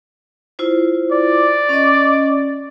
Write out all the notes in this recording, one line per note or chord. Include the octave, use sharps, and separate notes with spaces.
E4 F4 C5
D5
C#4 D#5